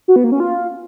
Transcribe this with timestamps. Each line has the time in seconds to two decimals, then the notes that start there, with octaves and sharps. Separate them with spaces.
0.08 F#4
0.16 B3
0.24 A#3
0.32 C#4
0.40 F4